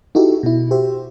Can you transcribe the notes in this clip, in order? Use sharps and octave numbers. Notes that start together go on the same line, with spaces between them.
D#4 E4 F#4 G4 A4
B2 E4
F#4 G4 C5 E5